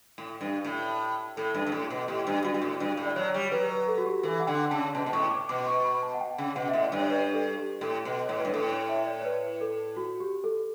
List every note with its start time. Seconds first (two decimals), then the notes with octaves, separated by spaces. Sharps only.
0.18 A2
0.41 G2
0.65 A2
1.37 A2 A4
1.54 G2
1.67 G2
1.72 A2
1.90 B2
2.08 A2 G4
2.27 G2
2.44 G2 F#4
2.54 G2
2.62 A2
2.80 G2
2.97 A2
3.06 D5
3.16 F#3 C#5
3.34 G3
3.51 F#3 B4
3.69 B4
3.88 A4
3.98 F#4
4.05 G4
4.23 E3 A4
4.40 F#5
4.47 D3 G5
4.71 C#3 A5
4.95 B2 A5
5.06 B2
5.13 A2 C#6
5.31 D6
5.49 B2 D6
5.67 C#6
5.79 C#6
5.85 B5
6.03 A5
6.14 F#5
6.20 G5
6.38 C#3
6.56 B2 F#5
6.69 A2 E5
6.83 D5
6.92 G2 C#5
7.10 B4
7.33 A4
7.57 G4
7.81 A2 A4
8.05 B2
8.26 A2 C#5
8.39 B4
8.45 G2
8.53 A2 A4
8.71 C#5
8.89 E5
9.07 D5
9.21 C#5
9.25 B4
9.61 A4
9.97 F#4
10.20 G4
10.44 A4